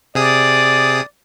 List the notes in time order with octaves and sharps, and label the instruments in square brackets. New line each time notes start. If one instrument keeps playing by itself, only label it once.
[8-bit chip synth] C3 G#4 D#6 [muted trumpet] D5